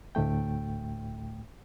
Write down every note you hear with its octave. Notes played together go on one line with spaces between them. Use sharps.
D2 A2 A3 G5